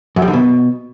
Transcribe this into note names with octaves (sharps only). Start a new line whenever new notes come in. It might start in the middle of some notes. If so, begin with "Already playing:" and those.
F#2
G3
D3
B2